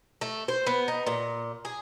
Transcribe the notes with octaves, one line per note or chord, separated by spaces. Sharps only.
A3
C5
B3
D#4
A#2
G#4